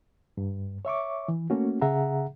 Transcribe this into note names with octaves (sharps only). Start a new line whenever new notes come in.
G2
C#5 E5 C#6 D6
E3
A3 A#3 C#4 F#4
C#3 G#4 E5 F#5 A#5